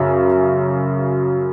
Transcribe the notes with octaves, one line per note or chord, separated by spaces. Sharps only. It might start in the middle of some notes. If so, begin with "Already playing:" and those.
Already playing: F#2 C#3 F#3 E5